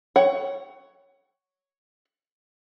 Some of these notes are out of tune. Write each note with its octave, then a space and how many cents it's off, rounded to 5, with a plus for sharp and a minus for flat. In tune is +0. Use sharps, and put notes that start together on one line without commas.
C#5 +0 F#5 +20